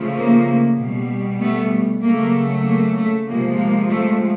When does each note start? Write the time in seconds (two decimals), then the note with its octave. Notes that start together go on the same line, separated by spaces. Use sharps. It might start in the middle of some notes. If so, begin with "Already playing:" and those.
Already playing: C#3 F3 A3
0.16 A#3
0.78 B2 G3
1.40 A3 B3
2.02 C#3 F#3 A3 A#3
2.65 A#3
2.96 A3
3.27 C3 F3 G#3 A#3
3.58 A#3
3.89 A3